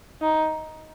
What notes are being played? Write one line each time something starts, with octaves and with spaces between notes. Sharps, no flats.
D#4